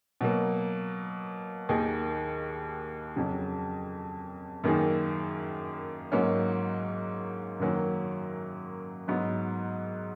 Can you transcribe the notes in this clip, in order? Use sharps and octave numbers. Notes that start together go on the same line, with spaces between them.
B2 F#3 A#3
D#2 D#3 A#3 D#4 G#4
F2 C#3 F#3
F#2 D#3 A#3 D#4 G#4
G#2 F#3 A#3 C#4
F#2 D#3 F#3 A#3 C#4
G#2 F#3 B3